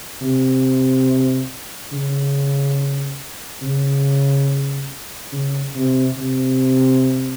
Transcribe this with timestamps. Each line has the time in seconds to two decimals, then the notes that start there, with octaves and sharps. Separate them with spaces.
0.21 C3
1.92 C#3
3.62 C#3
5.32 C#3
5.75 C3
6.18 C3